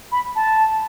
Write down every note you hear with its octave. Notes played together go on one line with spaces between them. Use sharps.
B5
A5